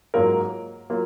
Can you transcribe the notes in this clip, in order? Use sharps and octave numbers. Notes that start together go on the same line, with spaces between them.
G#2 F#3 A#3 F4 A#4
F#3 A#3 F4